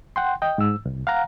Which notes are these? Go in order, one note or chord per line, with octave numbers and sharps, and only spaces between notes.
F#5 G5 C6
D#5 G5
G#2 E6
C2
F5 F#5 A#5